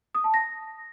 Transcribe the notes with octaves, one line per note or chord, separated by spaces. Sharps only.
D#6
A5
A#6